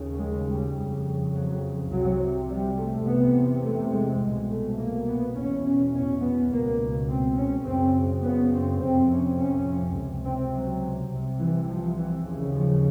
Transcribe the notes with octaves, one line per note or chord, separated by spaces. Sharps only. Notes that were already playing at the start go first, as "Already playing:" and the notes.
Already playing: D#2 C#3
G#3
G3
F2 C#3
F#3
C2 C3 F#3
G3
A3
E2 C3 B3
A3
G#3
C2 B2 G#3
A3
A#3
B3
E2 B2 C#4
C#4
C#4
B3
C#2 B2 A#3
C4
C#4
F#2 C#3 C4
B3
C4
F2 C3 C4
C#4
C#4
C#2 C3
C4
F#3
C2 C3
E3
F3
E3
D#2 C#3
F3